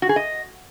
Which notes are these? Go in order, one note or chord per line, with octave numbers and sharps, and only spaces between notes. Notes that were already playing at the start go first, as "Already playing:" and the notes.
F#4
G#4
D#5